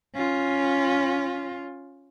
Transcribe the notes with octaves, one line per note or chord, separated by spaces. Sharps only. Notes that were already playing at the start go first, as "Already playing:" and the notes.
C#4 F4